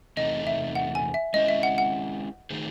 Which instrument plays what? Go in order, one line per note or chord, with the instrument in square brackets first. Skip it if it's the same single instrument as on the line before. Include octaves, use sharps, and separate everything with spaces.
[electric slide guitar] E2 C3 A3 D#4 [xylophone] D#5
[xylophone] E5
F#5
G#5
E5
[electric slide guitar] G#3 C#4 E4 C5 [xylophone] D#5
[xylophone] E5
F#5
F#5
[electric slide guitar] D#3 A3 D#4 G#4 C5